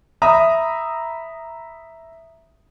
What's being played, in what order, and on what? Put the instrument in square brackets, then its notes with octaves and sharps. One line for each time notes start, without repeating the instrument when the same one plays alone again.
[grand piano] E5 A#5 B5 D#6